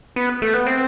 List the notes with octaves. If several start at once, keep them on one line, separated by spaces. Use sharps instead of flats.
B3
A3
B3
C4